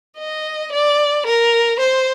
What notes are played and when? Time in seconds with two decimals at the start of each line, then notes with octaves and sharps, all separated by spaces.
0.18 D#5
0.72 D5
1.26 A#4
1.79 C5